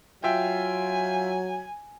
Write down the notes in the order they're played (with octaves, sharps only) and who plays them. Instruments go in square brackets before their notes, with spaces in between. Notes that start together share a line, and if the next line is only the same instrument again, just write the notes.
[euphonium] F#3 [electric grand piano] F4 E5 G5 [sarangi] G#5